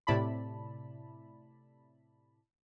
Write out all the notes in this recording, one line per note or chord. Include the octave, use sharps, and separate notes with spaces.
A2 C3 E4 D5 A5 B5